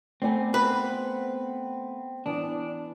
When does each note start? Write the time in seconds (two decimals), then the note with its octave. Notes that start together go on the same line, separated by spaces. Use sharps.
0.22 A3 B3 C4 D5 G#5
0.54 B4
2.26 E3 B3 D4